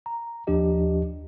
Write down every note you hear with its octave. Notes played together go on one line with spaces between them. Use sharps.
A#5
D#2 F3 D4 G4 D#5